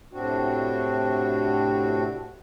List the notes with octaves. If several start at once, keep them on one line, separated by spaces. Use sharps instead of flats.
A2 C3 C4 D4 F#4